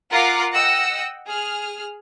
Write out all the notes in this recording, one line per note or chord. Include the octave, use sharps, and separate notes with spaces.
F4 A#4 F#5 A#5 D6 C7
D#5 F#5 G5 E6 A#6 C#7
G#4 F6